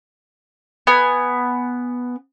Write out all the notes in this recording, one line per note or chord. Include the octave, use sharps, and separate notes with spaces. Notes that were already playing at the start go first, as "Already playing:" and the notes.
B3 G#5